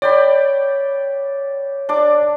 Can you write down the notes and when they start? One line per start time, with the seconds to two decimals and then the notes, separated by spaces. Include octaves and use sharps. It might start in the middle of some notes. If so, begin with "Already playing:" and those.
0.02 C#5 D5 G5 B5
1.89 D4 D6